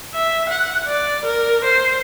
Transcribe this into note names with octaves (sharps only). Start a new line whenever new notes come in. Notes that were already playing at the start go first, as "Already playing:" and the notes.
E5
F#5
D5
A#4
C5